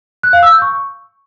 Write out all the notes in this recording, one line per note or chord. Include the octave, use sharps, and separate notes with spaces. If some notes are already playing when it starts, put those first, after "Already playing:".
F#6
F5
E6
G6
C#6